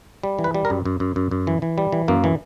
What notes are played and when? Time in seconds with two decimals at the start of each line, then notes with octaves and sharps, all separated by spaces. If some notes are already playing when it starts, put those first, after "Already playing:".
0.23 G3
0.39 E3
0.44 B4
0.54 G3
0.65 A#4
0.70 F#2
0.85 F#2
1.00 F#2
1.16 F#2
1.31 F#2
1.47 E3
1.62 E3
1.78 G3
1.92 E3
2.08 F#2 A#3
2.24 E3